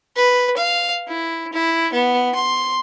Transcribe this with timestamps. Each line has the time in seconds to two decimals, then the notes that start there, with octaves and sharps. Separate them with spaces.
0.16 B4
0.57 F5
1.07 E4
1.53 E4
1.93 B3
2.35 C6